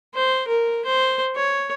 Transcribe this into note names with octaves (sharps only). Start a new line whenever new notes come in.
C5
A#4
C5
C#5